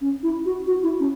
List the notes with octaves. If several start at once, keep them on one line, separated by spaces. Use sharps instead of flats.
C#4
E4
F#4
F#4
E4
C#4